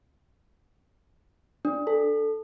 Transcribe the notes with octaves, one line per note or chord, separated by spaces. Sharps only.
D4
A4